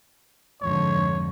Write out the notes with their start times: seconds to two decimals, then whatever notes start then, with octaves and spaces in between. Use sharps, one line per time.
0.62 F2 G#2 D3 C#5